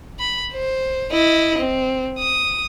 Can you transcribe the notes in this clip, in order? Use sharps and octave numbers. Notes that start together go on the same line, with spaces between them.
B5
C5
E4 D#5
C4
D#6